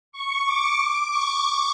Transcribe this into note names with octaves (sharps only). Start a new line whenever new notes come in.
C#6
D6
D6
C#6